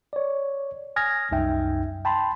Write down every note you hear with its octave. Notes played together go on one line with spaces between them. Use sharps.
C#5 D5
G#5 D#6 F6 G#6 A#6
C2 F#2 D#4 E5 G5
G5 A5 B5 C6